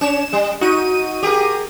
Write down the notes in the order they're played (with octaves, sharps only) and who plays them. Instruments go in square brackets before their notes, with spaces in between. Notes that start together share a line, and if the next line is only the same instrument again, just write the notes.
[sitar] C#4 C#5 [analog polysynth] E7
[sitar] G3
[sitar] D#4 [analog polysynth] F#4 D#7
[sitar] G4 G#4 A#4